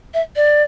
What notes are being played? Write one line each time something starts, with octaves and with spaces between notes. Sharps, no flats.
E5
D5